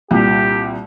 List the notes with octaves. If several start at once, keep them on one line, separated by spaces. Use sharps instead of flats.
C2 A#2 G4